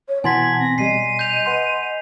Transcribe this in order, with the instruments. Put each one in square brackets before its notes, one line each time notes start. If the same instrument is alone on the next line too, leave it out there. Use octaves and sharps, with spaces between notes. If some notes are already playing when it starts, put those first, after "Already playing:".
[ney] C#5
[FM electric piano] B2 E3 A5 [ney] F#5 [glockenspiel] G#5 C6 B6 [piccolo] G#6
[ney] C4 [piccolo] A#6
[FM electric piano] B2 G3 [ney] D#5 [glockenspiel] C7 [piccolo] D#7
[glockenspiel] G6 F7
[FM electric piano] B4 F#5 C6